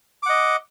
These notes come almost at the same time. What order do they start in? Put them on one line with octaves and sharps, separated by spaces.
D6 F#5 D#5